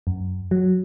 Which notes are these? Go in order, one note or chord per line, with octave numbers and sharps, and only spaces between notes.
F#2
F#3